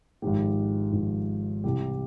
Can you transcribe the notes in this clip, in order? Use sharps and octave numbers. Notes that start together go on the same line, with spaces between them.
G#1 G#2 F3 G4
G#1 G#2 F3
C2 C3 E3 G3 G4